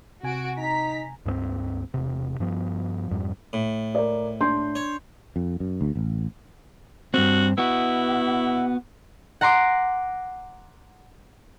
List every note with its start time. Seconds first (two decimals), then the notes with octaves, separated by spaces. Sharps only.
0.23 C3 F#4 G#5 D7
0.58 D#4 A#5 B6
1.25 C#2 G2 A3 C4
1.94 E1 C3
2.40 G2 F3 B3
3.11 F2 G#2 G3
3.53 A2
3.95 A#4 D5
4.40 D4 C6 G6
4.75 C#5
5.36 F2
5.60 F#2
5.81 D2
5.95 A1
7.14 G2 C4 F#4
7.58 B3 E4 F#4
9.41 F#5 A#5 C6 D6